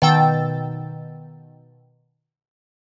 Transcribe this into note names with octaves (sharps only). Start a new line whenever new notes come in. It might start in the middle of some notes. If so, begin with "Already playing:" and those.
B2 D#3 G5 E6 A6